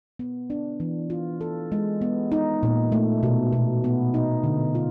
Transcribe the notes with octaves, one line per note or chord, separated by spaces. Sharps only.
B3
D4
E3
F4
A4
G#3
B3
D#4
A#2
A3
B2
B2
B3
D#4
D3
F4